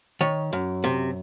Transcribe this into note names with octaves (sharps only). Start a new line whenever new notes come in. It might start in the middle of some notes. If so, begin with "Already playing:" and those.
D#3 C#5
F#2
C3